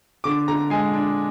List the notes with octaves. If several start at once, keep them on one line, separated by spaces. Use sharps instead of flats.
D3 D6
D3 A#5
G#3 G#5
D4